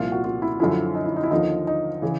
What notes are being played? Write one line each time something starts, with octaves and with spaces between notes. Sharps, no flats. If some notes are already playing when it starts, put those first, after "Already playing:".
Already playing: C2 A#2 F3 F4
F#4
F4
E4
F#2 D3 F3 E4
D#4
E4
D#4
E4
D#2 D3 F3 D#4
D#4
C#3 E3